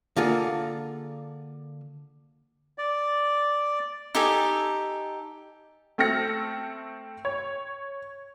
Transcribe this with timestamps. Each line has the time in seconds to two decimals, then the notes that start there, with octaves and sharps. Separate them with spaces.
0.16 D3 A#3 F4 G#4 A4
2.78 D5
4.15 D#4 G4 A4 G#5
5.98 A3 C4 A4 F6 A#6 C#7
7.25 C#5